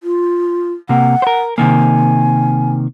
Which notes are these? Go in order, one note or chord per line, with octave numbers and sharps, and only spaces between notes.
F4
C3 A#3 F#5
A#4 C5
C3 D#3 A#3 G#5